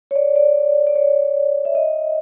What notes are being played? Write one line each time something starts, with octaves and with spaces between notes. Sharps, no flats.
C#5
D5
D5
D5
C#5
E5
D#5